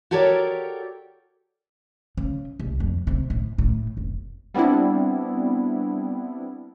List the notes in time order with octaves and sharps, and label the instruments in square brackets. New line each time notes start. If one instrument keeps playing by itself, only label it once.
[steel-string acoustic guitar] F#4 G4 A4 A#4 C#5 D5
[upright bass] C#3
C2
F2
C3
A2
A2
F1
[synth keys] G3 B3 C4 D4 E4